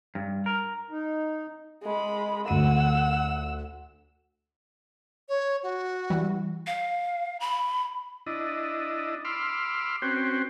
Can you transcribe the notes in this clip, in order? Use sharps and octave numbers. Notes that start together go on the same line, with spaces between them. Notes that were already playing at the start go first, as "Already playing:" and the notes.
G2
A#4
D#4
G#3 B5
D2 F#5 E6 D#7
C#5
F#4
E3 G3
F5
B5
D4 E4 D#5
B5 C6 D6 E6 F6
C4 C#4 F#4 B4 C5 G5